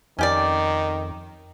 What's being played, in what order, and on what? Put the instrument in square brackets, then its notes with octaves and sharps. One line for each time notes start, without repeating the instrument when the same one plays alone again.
[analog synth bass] F2 [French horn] D#3 [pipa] C#4 G4 D5